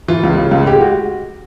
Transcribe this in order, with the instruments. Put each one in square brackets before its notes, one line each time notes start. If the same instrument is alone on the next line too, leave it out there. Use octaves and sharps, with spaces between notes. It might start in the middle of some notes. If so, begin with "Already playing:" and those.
[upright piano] E3 [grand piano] F4
[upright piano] C#2
C#3
C#2
[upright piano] G#3 [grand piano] G4
[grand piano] F#4